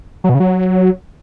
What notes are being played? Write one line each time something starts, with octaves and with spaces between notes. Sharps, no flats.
F#3
B2
C#3
F#3